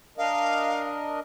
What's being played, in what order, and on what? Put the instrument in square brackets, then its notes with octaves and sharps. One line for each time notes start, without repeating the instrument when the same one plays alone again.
[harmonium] D4 A#4 D#5 [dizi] F5